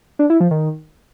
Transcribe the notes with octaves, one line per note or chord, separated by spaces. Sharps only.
D4
E4
F3
D#3